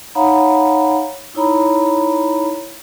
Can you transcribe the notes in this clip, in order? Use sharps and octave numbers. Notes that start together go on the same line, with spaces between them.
D#4 C#5 F5 F#5 A#5 B5
D#4 E4 C#5 A#5 B5